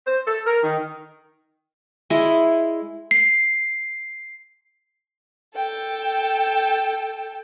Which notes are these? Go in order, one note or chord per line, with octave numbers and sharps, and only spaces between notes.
C5
A4
A#4
D#3
G#3 E4 D#5
C7
A4 G5